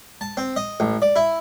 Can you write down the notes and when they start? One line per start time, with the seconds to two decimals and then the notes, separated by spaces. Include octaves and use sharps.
0.21 A5
0.37 C4
0.56 D#5
0.80 A1
1.02 D5
1.16 E4